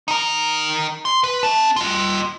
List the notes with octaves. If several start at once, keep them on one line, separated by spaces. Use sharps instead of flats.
D#4 A#4
C6
B4
C#4 A5
F4 D#5